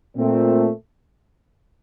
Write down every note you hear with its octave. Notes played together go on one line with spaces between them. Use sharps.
A#2 A3 C4